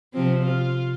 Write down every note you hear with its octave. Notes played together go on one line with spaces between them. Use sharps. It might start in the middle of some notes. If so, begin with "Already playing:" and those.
C3 F3 C4
F4